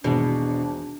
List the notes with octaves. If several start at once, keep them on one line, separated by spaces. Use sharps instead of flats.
G#1 E2 B2 D4